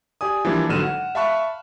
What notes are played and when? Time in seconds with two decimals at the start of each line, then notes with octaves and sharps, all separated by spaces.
0.21 G4 D5 G#5 D#6
0.45 E3 F3 G3 A#3 D4
0.69 G#1 D3 F#3 F6 D#7 E7
0.84 F#5
1.15 E5 F5 A5 B5 C#6 F#6